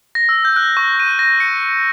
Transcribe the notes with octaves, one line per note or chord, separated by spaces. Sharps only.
A#6
E6
G6
F#6
C#6
D#7
A#6
C#7